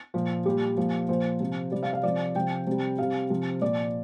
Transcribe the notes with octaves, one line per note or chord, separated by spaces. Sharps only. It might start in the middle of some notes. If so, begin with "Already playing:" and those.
A#2 F3
A#2 G3 G4
A#2 F3
A#2 F3 C5
C3 F3
C3 G3 D5
F5
F5
C3 F3 D5
C3 F3 G5
C3 G3
C3 G3 F5
C3 F3
A#2 F3 D5